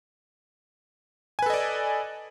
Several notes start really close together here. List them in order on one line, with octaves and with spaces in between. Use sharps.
G#5 B4 A4 D#5 D5